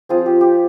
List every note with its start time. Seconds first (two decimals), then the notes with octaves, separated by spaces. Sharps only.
0.09 F3 C4 F4 G#4
0.26 G4
0.41 G4